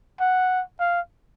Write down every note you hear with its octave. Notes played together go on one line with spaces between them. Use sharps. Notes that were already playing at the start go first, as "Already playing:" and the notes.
F#5
F5